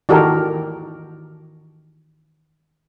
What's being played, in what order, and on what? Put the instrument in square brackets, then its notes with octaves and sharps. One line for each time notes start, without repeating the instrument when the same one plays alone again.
[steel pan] D#3 E3 F#4 G4 A4 A#4